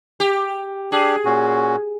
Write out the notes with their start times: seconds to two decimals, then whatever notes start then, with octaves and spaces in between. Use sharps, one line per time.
0.20 G4
0.92 D4 G4 G#4
1.25 A#2 C#4 F#4